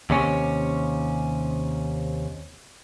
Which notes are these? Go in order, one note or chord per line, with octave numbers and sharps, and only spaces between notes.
D#2 C3 C#4